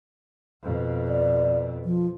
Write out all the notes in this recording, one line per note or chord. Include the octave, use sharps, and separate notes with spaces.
F2 B2
D5
F3